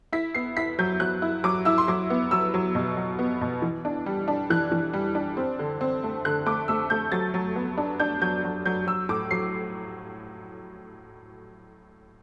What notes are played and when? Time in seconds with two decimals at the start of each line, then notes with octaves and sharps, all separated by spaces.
0.13 E4 B6
0.34 B3 C7
0.56 E4 B6
0.79 F#3 G6
1.00 F#3 F#6
1.22 E4
1.44 F#3 D6
1.65 E4 E6
1.78 C6
1.88 F#3 D6
2.10 B3
2.31 F#3 E6
2.54 F#3
2.75 B2
2.97 F#3
3.19 B3
3.41 B2
3.62 E3
3.85 D4
4.06 G3
4.28 D4
4.50 E3 F#6
4.72 E3
4.93 G3
5.15 D4
5.37 C4
5.59 D3
5.81 C4
6.03 A3
6.25 D3 F#6
6.46 A3 D6
6.68 A3 E6
6.90 A3 G6
7.12 F#3 A6
7.34 F#3
7.56 B3
7.77 D4
8.00 D4 G6
8.22 F#3 G6
8.44 F#3
8.65 F#3 G6
8.87 F#3 E6
9.09 A2 D6
9.31 F#3 C7